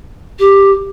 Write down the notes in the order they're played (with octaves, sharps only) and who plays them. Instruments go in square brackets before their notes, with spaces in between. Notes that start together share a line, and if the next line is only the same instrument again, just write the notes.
[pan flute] G4